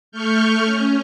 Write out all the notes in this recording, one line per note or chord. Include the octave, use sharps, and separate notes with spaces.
A3 C#6 F6 G6
C#4